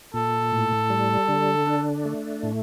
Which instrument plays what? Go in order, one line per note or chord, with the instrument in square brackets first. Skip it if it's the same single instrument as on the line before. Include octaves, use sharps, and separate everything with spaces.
[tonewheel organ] A#2 [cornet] A4
[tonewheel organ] A2
G3
D3
D4
A3
A2